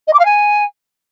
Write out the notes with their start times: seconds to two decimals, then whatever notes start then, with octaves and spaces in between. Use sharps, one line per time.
0.07 D#5
0.13 D6
0.19 F5
0.25 G#5